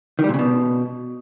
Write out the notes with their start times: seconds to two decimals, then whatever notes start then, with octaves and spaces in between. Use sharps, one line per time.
0.19 D#3
0.24 G3
0.29 A#2
0.34 C#3
0.39 B2